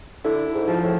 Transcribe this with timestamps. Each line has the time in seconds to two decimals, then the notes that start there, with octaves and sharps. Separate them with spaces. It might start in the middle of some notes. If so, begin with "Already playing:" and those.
0.24 D3 E4
0.54 G#2
0.68 F3
0.83 A2